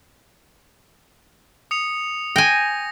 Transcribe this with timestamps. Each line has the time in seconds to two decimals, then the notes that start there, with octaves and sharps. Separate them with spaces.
1.71 D#6 C#7 F7
2.36 G5 G#5 A#6